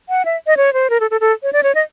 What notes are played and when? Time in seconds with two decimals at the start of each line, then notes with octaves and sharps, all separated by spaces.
0.09 F#5
0.25 E5
0.47 D#5
0.57 C#5
0.73 C5
0.90 A#4
1.00 A4
1.11 A4
1.21 A4
1.43 C#5
1.53 D5
1.63 C#5
1.75 D#5